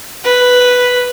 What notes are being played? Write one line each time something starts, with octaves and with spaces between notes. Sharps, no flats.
B4